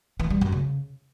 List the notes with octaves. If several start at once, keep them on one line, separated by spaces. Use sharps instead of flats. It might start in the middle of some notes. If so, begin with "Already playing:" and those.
E3
G3
F#2
C#3